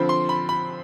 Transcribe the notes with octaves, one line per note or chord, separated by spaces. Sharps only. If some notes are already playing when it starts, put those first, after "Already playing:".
Already playing: D3 F3 C4 B5
C6
B5
B5